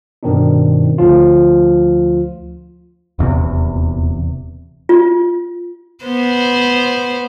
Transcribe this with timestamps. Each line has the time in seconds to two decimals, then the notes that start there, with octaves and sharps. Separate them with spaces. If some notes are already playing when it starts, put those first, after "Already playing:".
0.23 G2 B2 D#3 C4 D4 D#4
0.98 D2 F3 F4
3.19 D#1 E2 C3
4.89 F4
6.05 B3 C5